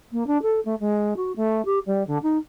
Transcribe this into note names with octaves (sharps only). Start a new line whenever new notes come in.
A#3
D4
A4
A3
G#3
F#4
A3
G4
G3
D3
D#4